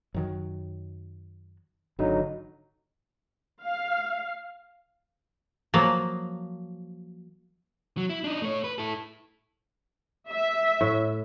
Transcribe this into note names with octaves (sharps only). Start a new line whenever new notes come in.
F#2 D#3 F#3
G#1 D3 F#3 D#4
F5
F3 F#3 A#3
F#3
E4
D4 D#4
A3 C#5
B4
E4 A4
E5
A2